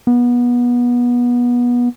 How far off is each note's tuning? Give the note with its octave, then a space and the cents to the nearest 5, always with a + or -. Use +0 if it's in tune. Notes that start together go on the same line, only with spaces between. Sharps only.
B3 -25